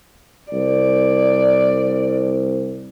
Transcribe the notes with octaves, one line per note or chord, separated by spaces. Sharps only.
C2 D5